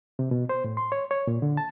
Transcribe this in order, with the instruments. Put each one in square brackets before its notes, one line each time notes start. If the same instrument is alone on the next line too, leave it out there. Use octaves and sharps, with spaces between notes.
[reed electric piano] C3
B2
C5
A2
C6
C#5
C#5
A#2
D3
A5